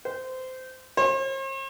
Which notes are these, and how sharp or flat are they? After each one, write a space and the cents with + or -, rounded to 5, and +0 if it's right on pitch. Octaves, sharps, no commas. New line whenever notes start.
C5 -20
C5 +45